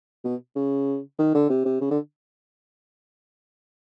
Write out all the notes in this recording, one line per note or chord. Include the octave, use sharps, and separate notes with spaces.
B2
C#3
D#3
D3
C3
C3
C#3
D3